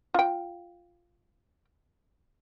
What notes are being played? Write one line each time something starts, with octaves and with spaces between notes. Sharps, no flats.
F4 G5